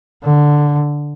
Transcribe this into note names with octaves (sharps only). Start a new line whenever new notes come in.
D3